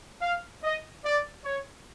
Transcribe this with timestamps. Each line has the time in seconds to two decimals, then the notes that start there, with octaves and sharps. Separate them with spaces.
0.22 F5
0.64 D#5
1.05 D5
1.45 C#5